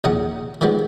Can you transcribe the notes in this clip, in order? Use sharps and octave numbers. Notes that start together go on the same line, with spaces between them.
A#1 D#2 G#4 F#5
D#3 F3 G3 G#3 B3